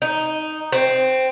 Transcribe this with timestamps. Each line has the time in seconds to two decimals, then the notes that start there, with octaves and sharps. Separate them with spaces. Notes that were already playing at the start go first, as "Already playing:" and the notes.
0.02 D#4
0.72 C4